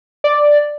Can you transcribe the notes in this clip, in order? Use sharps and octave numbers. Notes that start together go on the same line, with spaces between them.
D5